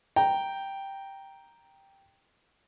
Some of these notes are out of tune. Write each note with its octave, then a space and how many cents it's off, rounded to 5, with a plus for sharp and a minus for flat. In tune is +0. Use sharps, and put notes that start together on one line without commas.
G5 +0 A#5 +0